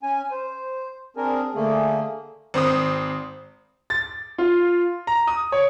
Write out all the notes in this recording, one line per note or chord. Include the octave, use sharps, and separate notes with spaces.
C#4 G#5
C5
C4 D4 G#4 A#4
D3 A3 A#3 G#4
G#1 C4 C5 D#6
A6
F4
A#5
D#6
C#5